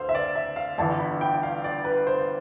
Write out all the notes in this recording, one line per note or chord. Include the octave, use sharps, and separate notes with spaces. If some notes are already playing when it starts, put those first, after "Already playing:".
Already playing: D2 C5 F5
E5
D5
E5
F5
G1 G2 E3 A5
B5
G5
F5
D5
B4
C5